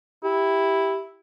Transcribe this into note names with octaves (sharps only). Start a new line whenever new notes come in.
E4 G4